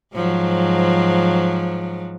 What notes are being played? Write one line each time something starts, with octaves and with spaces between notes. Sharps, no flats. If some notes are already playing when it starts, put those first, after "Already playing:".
G#2 F3 F#3